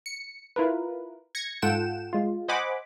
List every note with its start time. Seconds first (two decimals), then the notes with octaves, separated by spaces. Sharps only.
0.06 C#7
0.56 E4 F4 A#4 B4
1.35 G#6 A#6 C#7
1.62 G#2 F4 A4 F#5 G5 E7
2.13 G#3 F4
2.48 C5 D#5 F#5 G#5 B5 D6